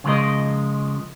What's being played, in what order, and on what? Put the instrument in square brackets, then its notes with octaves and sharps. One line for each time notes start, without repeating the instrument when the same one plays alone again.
[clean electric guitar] C#3 F3 G#3 A#4 D#5